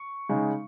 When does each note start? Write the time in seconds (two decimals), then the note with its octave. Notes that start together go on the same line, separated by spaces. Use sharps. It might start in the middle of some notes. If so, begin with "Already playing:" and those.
Already playing: C#6
0.29 C#3 G#3 D#4